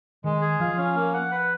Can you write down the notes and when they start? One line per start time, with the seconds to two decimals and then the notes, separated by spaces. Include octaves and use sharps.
0.24 D#3 G#3
0.41 G#4
0.60 F3 F4
0.78 C#4
0.95 A#3
1.14 F#5
1.32 B4